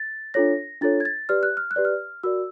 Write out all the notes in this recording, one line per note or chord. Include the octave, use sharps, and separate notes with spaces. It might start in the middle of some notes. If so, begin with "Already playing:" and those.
Already playing: A6
D4 F4 A4 C#5 A#6
D4 F4 A4 C#5 A6
G#6
A6
G4 B4 D5 F6
F#6
F6
F#6
G4 B4 D5
F6
F#4 A#4 D5 E6